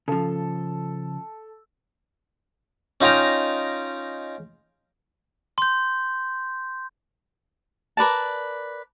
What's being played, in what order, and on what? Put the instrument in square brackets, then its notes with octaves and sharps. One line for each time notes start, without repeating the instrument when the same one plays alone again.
[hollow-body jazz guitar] C#3 F3 [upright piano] A4
[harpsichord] C#4 D#4 F4 D#5 G5 A#5
[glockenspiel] C6 G6
[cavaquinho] A#4 B4 D5 A5